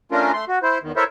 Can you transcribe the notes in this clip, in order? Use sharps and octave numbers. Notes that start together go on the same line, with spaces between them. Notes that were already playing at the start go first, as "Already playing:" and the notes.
A3 C#4 D4 F4 A#4
A3 C6
F#4
E4 C5
E2 D#3
E4 A4 A#4 C5 C#5 E5